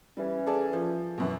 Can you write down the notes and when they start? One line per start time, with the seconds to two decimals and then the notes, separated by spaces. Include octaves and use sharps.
0.17 E3 G3 C#4
0.46 G#4 A4 D5
0.73 F3
1.18 F#2 B2 E3